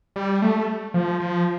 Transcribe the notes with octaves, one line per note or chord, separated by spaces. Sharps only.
G3
A3
F3
F3